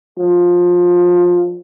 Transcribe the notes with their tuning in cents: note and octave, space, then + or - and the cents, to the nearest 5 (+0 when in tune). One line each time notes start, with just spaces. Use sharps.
F3 +20